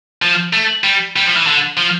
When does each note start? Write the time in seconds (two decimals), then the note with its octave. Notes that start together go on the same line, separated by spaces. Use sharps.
0.22 F3
0.53 A3
0.84 G3
1.16 G3
1.26 F3
1.36 E3
1.47 D3
1.77 F3